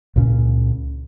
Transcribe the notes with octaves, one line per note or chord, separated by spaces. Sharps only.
C#2 A#2 C#3